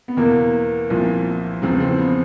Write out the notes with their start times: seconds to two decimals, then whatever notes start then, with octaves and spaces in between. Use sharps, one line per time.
0.08 B3
0.17 E2 B2 A#3
0.90 C2 A#2 F3
1.62 E2 C#3 F3 C4
1.80 C4
1.98 B3